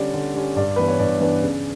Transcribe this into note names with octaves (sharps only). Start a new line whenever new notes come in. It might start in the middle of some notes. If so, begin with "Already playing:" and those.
Already playing: D3 G3 C#4 D5
D3
G3 C#4
G2 D5
E3 B3 D4 B4
C#5
G2 D5
E3 B3 D4
C#3